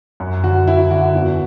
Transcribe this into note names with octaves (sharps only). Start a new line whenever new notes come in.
F#2
D3 F#4
F#2 E4
D3 F#4
E2